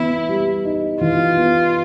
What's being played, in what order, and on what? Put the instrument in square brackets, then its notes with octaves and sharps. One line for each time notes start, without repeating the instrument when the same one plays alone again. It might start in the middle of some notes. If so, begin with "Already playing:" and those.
Already playing: [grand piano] E3 B3 [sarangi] E4
[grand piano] G3
D#4
[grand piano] E3 [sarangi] F4
[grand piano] B3